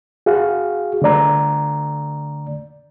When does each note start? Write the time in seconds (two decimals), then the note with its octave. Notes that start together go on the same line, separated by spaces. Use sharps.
0.26 F#4 G#4 F5
1.02 D3 A3 D5 A#5